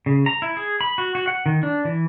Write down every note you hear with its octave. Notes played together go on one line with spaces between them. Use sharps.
C#3
A#5
E4
G#4
B5
F#4
F#4
F#5
D#3
D4
E3